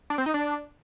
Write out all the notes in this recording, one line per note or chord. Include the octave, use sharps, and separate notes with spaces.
D4
C4
D#4
D4